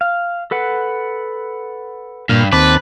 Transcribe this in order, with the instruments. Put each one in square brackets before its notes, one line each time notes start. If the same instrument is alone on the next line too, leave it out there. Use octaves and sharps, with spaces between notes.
[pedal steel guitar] F5
A4 B4 F#5
[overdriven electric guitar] G2 [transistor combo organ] A#2 F6
[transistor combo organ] D#2 C4 A5 [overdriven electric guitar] B4 [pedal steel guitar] D6